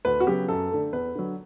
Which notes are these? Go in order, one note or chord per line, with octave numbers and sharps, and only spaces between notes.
D2 B4
F#4
C#3 F#3 B3 G4
F#2 A4
D3 A3
E2 B4
D3 F#3